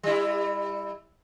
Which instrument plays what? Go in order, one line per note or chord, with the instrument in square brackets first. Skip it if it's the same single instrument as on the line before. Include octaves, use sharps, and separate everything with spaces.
[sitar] G3 E4